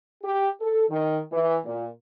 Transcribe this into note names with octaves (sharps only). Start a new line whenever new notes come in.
G4
A4
D#3
E3
A#2